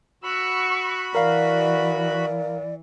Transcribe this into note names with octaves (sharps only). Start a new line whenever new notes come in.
F#4 B5 C#6 E6
E3 A#4 D5 F5